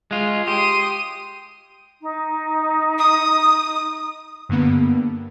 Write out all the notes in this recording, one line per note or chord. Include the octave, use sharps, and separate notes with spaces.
G#3 F4
G4 C6 D#6
D#4
D#6
G2 D3 A#3 B3